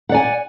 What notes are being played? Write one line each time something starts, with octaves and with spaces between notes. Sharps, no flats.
D5 F#5 G#5